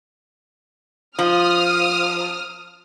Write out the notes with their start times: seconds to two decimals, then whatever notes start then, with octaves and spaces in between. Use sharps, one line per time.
1.19 F3 D#6 F6